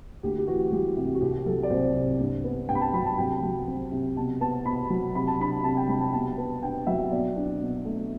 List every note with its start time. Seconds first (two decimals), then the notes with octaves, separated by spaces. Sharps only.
0.23 D2 G4
0.38 G4
0.47 E3 F#4
0.72 G3 G4
0.97 C3
1.15 F#4
1.21 C2 G4
1.46 F#3 A4
1.63 D5
1.70 C2 C5
1.95 C3
2.19 G2
2.44 B3
2.69 G2 G5
2.75 B5
2.81 A5
2.93 F#3 B5
3.06 A5
3.18 C2 G5
3.43 F#3
3.67 C4
3.92 C3
4.17 B2 A5
4.41 B3 A5
4.65 B2 B5
4.90 F#3
5.15 C3 B5
5.27 A5
5.39 D4 B5
5.64 C3 A5
5.77 G5
5.88 G3 B5
6.01 A5
6.13 B2 A5
6.38 B3
6.62 D4 G5
6.87 F#3 E5
7.11 B2 D5
7.36 D4
7.61 B2
7.85 A3